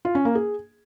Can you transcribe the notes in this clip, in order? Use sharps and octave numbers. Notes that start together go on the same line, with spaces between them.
F4
C#4
A#3
G#4